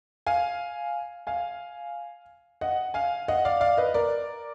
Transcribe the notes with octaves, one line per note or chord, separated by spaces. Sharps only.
F5 G#5
F5 G#5
D#5 F#5
F5 G#5
D#5 F#5
D5 F5
D5 F5
B4 D#5
A#4 D5